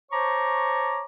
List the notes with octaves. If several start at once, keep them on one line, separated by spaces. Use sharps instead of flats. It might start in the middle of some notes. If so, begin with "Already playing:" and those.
C5 C#5 A5 A#5 C#6 D6